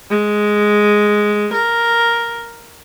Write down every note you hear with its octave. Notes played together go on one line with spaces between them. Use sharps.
G#3
A#4